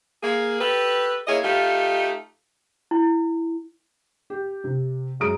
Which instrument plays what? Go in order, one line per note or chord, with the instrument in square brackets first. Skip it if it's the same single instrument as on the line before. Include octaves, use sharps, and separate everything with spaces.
[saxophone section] A#3 G#4
G4 A4 B4
A#3 E4 G#4 C#5 D#5
A3 D#4 F4 G4
[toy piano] E4
[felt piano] G4
C3
F#2 G#3 G#4 A#5 D#6 D7